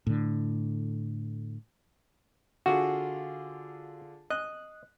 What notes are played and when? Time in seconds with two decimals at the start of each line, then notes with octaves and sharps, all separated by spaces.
0.07 A2 D3
2.66 D3 F4 F#4 G#4
4.30 D#5 F#6